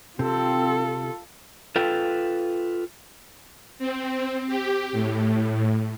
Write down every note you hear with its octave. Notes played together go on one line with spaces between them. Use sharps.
C3 C4 F4 A4
F4 A4 B4 G5
C4
G4
A2